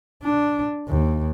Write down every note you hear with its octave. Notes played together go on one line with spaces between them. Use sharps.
D4
D#2